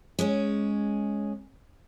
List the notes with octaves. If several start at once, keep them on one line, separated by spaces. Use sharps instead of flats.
G#3 C#4